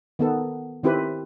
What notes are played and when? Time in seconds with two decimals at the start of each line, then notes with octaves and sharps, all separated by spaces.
0.19 D#3 B3 A4
0.84 D#3 C4 E4 G4 B4